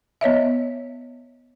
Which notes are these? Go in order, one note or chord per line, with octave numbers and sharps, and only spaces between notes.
B3 C#5 D#5 E5